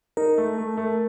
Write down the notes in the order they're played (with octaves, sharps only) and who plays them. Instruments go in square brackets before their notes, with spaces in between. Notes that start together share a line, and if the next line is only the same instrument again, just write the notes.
[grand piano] D#4 [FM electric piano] A#4
[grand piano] A3
A3
A3